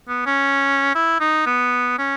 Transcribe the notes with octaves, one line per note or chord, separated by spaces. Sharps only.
B3
C#4
E4
D#4
B3
C#4